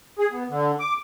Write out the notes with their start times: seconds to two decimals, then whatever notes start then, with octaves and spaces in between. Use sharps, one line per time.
0.19 G#4
0.32 B3
0.49 D3
0.80 D6